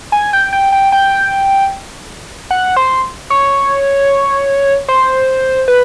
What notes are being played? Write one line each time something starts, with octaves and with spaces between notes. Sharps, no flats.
G#5
G5
G5
G5
G5
F#5
C5
C#5
C5
B4